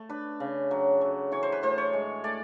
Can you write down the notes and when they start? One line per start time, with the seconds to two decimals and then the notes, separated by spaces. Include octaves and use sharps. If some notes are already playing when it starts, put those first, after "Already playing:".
Already playing: A3
0.09 D4 B4
0.40 C#3
0.71 F#3
1.01 F#3
1.32 E3 C#5
1.43 C5
1.52 B4
1.63 A2 C5
1.78 C#5
1.93 G#3
2.24 A3 D5